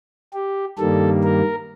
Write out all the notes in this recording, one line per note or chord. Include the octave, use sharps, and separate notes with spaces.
G4
G2 D#3 G3 A#3 A4
A#4